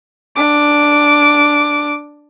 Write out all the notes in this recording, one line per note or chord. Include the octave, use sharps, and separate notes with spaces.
D4 D6